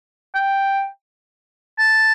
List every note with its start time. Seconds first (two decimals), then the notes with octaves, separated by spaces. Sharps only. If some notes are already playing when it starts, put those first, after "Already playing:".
0.35 G5
1.79 A5